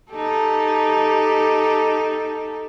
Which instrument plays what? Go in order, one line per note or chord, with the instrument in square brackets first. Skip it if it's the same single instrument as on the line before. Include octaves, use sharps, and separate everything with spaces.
[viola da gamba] D#4 G4 A4